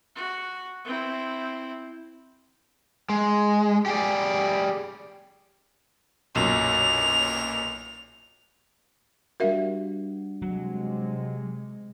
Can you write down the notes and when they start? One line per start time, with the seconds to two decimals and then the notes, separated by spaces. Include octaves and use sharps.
0.15 F#4
0.85 C4 E4
3.10 G#3
3.86 G4 G#4 D5
6.35 B1 F#2 A#2 F7
9.40 G3 D4 F#4 A#4 E5 F5
10.42 C3 F#3 G#3